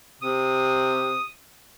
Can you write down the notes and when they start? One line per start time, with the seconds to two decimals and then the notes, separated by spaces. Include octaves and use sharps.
0.22 C3 D#6